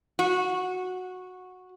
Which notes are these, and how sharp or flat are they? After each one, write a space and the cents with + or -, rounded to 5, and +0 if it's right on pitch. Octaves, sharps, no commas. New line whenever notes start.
F#4 -10